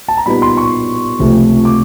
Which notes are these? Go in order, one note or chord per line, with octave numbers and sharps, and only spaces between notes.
A5
A#5
A#2 G3 B3 D#4 B5
C6
C#6
C#2 C3 F3 A3 C4
D6